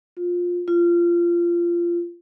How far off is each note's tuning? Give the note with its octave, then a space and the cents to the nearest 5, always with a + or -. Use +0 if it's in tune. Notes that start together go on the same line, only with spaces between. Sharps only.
F4 +15
F4 -20